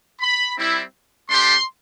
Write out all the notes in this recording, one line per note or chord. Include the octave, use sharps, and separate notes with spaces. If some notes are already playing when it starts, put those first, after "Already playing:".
B5
G3 C4 E4
A3 D4 G4 C6